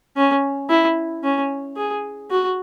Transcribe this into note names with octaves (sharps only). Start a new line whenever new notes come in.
C#4
E4
C#4
G#4
F#4